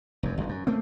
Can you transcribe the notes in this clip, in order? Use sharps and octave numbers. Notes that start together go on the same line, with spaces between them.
F1 F#2
G1 E2
F#2
A3 A#3 C4